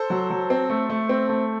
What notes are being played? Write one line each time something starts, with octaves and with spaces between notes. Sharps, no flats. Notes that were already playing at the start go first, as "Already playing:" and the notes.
Already playing: A4 C5
F#3
F#3
C4
A3
A3
C4
A3